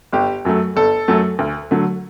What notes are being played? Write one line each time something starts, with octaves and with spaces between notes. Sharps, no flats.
G1 G4
F#2 F#3 A3
G1 A4
F#2 F#3 A3
D2
D3 F#3 A3